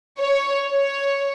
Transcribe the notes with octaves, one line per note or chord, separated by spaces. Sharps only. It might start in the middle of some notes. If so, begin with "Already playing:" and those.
C#5
C#5